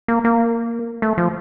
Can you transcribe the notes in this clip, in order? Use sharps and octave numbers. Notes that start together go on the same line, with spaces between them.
A#3
A#3
A3
F3